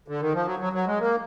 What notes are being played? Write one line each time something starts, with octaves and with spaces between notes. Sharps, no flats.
D3
D#3
F3
F#3
F#3
F#3
G#3
A#3